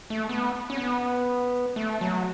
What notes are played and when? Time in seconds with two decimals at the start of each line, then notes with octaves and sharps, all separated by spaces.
0.10 A3
0.29 B3
0.70 C#4
0.78 B3
1.76 A3
2.01 F#3